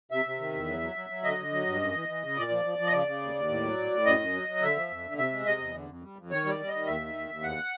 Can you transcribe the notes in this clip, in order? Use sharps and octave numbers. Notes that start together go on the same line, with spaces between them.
C3 E5
C3
D#3
E2
F#3
F#3
F#3
F#3
D3 D#5
D3
F#3
G2
F#2
E3
E3
C#3
A#2 D5
F3
F3
F3
D#5
C#3 D5
C#3
D#2
D#2
A2
F#3
A2
A2
F#2 D#5
F#2
F#3
F#3
D3 E5
F3
F2
D3
C3 E5
G#3
C3 D#5
E2
D3
F2
G3
F2
D#3 C#5
G3 D5
G3
D#5
D#3
D#2 E5
D#3
D#2
D#2
E2 F#5